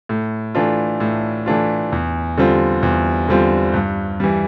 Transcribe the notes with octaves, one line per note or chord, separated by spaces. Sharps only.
A2
E3 A3 D4 F4
A2
E3 A3 D4 F4
E2
D3 G3 C4 F4
E2
D3 G3 C4 F4
G2
E3 G3